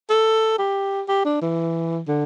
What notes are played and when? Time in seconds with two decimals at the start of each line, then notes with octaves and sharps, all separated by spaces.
0.10 A4
0.58 G4
1.08 G4
1.25 D4
1.42 E3
2.08 D3